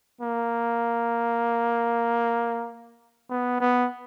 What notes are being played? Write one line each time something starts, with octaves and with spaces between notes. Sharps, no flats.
A#3
B3
B3